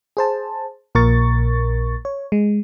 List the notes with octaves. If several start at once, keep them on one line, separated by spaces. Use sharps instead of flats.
G#4 C5 A5
A#1 A#2 A#4 C#6 A6
C#5
G#3